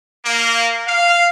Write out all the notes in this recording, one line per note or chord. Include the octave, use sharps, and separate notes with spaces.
A#3
F5